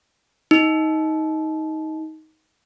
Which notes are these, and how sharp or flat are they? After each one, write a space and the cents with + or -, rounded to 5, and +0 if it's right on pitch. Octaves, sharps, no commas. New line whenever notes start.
D#4 +15